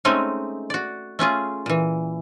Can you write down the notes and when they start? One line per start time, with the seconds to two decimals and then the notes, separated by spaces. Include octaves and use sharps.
0.05 G#3 A3 C4 C#4 D#4
0.70 F#4 D5
1.19 A3 C#4 F4 G#4
1.66 A#2 E3